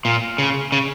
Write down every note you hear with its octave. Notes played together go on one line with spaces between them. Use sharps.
A#2
C#3
C#3